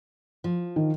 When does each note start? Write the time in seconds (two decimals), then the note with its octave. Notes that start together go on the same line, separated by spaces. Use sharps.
0.44 F3
0.76 D#3